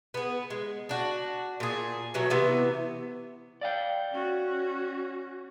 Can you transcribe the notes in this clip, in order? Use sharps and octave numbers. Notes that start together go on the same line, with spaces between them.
B3 G#4
G#3
D4 F#4
A#2 G#4
B2 E3 F#3 A3
C3 E3 B3 E5
D5 F5 G5
C#4 F#4